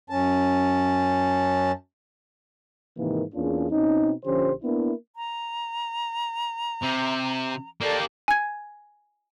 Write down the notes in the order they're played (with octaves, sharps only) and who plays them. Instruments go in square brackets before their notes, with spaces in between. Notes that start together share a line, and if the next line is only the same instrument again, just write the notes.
[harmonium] F#2 C#4 A5
[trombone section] G#2 C3 D#3 E3 A#3
E2 A#3 C#4 D4 F4 G#4
B2 C4 C#4 D#4
A#1 D3 F3 C#4 G4 C5
A#3 B3 D4 E4
[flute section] A#5
[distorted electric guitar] C3
[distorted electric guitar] A#3 G4 [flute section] A4 D5
[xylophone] G#5 G#6